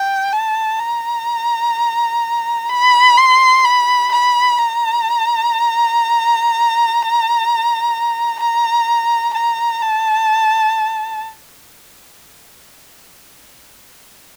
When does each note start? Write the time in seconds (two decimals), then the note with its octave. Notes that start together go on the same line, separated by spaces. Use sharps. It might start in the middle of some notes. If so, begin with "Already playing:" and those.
Already playing: G5
0.32 A5
0.79 A#5
2.69 B5
3.17 C6
3.65 B5
4.12 B5
4.59 A#5
8.40 A#5
9.34 A#5
9.81 A5